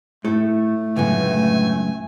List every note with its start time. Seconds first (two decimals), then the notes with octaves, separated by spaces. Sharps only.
0.25 A2 A3 E4 A4
0.96 C#2 F#2 A2 D3 B3 G#5